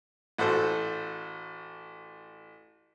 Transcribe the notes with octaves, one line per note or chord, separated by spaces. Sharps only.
A1 F#4 A4 C5